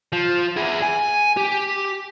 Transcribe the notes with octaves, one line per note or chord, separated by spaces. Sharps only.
F3
E4 G#4
G#5
G4